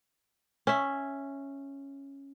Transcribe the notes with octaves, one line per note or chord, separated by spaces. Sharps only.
C#4 E5